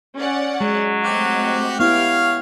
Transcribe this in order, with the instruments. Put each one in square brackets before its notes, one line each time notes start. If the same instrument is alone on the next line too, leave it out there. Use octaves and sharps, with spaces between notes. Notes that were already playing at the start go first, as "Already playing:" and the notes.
[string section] C#4 D5 F#5
[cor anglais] F#3 [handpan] G#3
[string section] A3 C4 D#5 [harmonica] F#4 G4
[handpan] B3 E4 [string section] G4 [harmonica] C#5 F5 F6